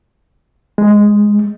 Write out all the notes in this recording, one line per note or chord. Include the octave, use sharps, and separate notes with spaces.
G#3